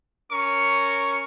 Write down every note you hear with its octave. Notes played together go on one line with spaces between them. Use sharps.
C#4 A#4 C#6